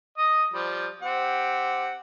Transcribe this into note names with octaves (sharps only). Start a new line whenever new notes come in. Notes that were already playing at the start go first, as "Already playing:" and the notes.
D#5 D#6
F3 G3
C4 G4 F#5